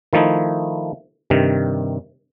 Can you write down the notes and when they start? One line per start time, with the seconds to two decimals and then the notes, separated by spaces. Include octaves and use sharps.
0.13 D#3 F3 A3 D#4 E4
1.30 G2 C3 D#3